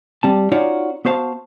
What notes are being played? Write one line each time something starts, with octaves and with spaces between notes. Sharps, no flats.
G3 C4 A5
C#4 D#4 F4 F#4 C#5 D5
B3 F#4 C5 F5 A5